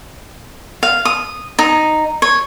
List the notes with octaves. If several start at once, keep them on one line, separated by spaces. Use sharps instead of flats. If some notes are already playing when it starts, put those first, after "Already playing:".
F5
D#6
D#4
C#5